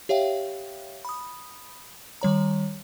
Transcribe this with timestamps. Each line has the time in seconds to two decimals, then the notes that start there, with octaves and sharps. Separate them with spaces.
0.09 G4 C#5 E5 F5 G5
1.05 B5 D#6
2.21 D#3 G3 C#5 A#5